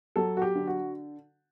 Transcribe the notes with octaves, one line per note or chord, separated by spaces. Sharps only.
F#3 A4
F#4
G4
D3
F#4